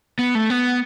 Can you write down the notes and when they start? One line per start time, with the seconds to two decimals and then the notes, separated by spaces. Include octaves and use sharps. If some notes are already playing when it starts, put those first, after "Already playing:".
0.19 B3
0.35 A3
0.50 B3